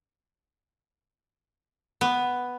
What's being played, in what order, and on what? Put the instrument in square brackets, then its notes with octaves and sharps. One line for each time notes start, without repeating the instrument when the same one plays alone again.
[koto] B3